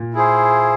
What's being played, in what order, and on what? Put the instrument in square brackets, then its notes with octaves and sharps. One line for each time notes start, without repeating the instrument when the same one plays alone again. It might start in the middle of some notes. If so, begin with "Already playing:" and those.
Already playing: [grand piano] A#2
[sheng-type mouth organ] E4 G#4 C5